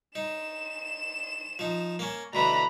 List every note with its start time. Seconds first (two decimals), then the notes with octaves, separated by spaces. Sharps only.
0.15 D#4 E7
1.59 F3 D#4
1.99 A#3 C#4
2.33 D2 B2 E3 A#5 B5